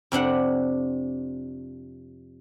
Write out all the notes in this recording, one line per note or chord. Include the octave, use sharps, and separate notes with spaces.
F2 C3 D4 F#5